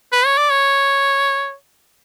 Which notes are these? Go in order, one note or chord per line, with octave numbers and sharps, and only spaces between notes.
B4
C#5
D5
C#5